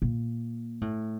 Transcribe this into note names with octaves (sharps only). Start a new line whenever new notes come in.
A#2
A2